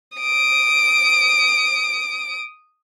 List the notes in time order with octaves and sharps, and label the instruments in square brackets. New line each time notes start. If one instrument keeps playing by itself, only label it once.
[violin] D#6 D7